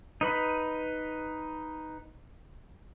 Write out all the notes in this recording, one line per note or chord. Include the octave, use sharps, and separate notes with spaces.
D#4 B4 B5